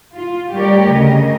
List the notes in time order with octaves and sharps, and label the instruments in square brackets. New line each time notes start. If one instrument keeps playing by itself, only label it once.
[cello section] F4
G3 A3 G4 A#4 C#5 D5
D2 C#3 A#4 D#5